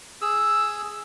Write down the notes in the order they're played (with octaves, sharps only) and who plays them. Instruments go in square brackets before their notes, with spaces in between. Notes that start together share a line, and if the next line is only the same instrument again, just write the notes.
[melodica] G#4 E6